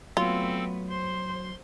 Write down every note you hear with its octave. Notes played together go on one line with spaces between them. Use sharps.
F#3 A3 B3 C4 F4 A4
C5 C6